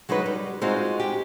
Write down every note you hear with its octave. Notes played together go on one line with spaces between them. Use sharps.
F#3 G#3 D#4 F#4 B4
G3
G#3 C4 D#4 F4 F#4
G4